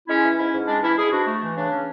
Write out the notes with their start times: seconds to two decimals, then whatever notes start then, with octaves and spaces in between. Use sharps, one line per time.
0.08 G#3 C#4 E4
0.24 E3
0.38 G#2 C#4 E4
0.53 G#2
0.68 G#3 D4
0.83 E3 C#4 E4
0.98 G#2 E4 G#4
1.12 G#2 D4 F#4
1.27 A3
1.42 E3
1.57 C#3 D4
1.72 C#4